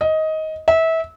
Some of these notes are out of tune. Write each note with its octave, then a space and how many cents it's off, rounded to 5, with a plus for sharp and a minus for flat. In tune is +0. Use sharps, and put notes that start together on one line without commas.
D#5 +15
E5 -25